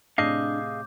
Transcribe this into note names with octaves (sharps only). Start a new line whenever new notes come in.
A2 C3 D4 G#4 D#5 F5 D6 G6